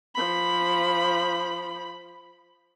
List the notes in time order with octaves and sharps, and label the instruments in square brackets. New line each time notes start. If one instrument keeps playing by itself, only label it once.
[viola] F3 B5